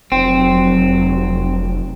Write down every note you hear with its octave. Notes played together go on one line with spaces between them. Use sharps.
F1 F#3 C4